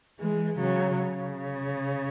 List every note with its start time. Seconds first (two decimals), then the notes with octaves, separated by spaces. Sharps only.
0.19 E3 G#3
0.58 C#3 F#3
0.98 C#3